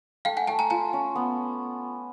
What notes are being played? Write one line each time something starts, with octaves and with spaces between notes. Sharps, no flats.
A3 F5 G5
F#5 G#5
A3 G5 A5
G#5 A#5
F4 G#5 A#5
C#4
B3